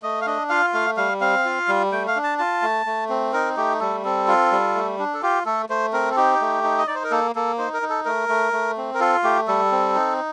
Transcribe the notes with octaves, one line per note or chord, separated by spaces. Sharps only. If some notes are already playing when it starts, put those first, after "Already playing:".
A3 D#5
F5
D4 D#5
F4 F5
A3 F5
G3 F5
C4 F5
F4
G3
A3 G5
F5
D4
A5
F4 A5
A3
A3
C4
D#4 A#4
A3 G4
G3 A4
C4 A4
F4
G3
A3
D4
A4
F4 G4
A3 A4
A3 C5
C4 A#4
A4
D#4 G4
A3
D#4
D#5
D#4 D5
C5
A#4
A#3 A4
A#3 A4
D#4 C5
A#4
D#4
A4
A3 A#4
A3
A3
C4
A#4
F4 A4
A3 G4
G3 A4
C4
D#4